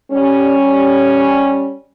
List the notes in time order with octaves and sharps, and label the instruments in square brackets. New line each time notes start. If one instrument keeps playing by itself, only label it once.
[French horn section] G3 C#4